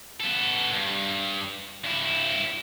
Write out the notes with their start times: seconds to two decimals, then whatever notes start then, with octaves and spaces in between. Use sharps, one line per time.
0.20 B3 A4
0.73 G2
1.84 G2 E4